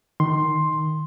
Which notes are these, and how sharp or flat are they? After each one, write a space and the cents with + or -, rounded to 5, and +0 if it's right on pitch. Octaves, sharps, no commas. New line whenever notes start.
D#3 +0 C6 +10